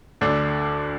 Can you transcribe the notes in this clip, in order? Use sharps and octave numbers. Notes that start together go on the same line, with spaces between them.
D2 D3 D4